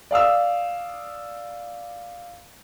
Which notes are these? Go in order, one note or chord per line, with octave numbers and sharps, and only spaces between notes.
D5 F5 D#6 E6